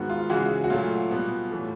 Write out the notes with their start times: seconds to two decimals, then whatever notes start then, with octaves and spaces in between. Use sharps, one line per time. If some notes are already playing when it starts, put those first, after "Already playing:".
Already playing: G#2 D#3 G#3 B3 F#4
0.10 F4
0.30 C#3 E3 G#3 F#4
0.64 F#4
0.70 A#2 F#3 A3 F4
1.11 B2 G3 B3
1.51 A2 E3 A3